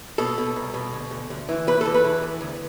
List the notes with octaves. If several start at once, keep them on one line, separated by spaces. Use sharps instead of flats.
B2 A4
B2
C2
B2
D2
D2
D2
E3
E2 B4
E2 A4
B4
E3
E2
D2